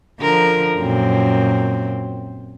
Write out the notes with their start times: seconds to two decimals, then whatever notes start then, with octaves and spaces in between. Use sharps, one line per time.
0.20 D3 F3 A#4
0.77 F#2 A#2 C4